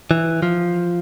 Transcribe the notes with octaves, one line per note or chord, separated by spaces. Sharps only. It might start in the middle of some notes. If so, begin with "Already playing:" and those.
E3
F3